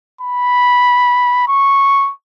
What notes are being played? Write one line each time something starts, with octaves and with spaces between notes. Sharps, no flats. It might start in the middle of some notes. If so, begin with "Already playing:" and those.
B5
C#6